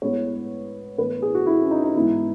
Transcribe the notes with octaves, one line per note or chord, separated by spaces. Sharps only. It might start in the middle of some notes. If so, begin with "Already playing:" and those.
A2 G#3 B3 C#5
A2 E3 B3 B4
G#4
F#4
E4
C#4
D#4
D#4
G#2 E3 B3 E4